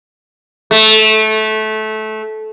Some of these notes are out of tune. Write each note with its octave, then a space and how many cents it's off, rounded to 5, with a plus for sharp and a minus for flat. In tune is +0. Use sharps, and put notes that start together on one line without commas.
A3 -20